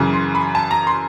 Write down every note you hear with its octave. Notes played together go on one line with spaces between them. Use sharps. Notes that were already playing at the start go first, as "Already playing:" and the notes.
Already playing: F#2 C#3 E3
C6
B5
A5
A#5
C6